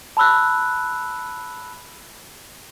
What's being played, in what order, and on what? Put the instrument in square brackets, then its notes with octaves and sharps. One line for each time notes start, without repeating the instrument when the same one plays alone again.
[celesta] A5 B5 E6 F#6